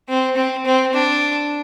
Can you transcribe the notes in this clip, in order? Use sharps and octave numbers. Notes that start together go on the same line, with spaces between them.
C4
C4
C4
D4